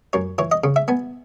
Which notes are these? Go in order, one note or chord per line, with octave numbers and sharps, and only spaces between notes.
F#2 C#5
E3 C#5
D#5
C#3
E5
B3 G#5